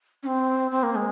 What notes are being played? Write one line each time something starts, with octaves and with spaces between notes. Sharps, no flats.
C#4
C4
C4
A#3
G#3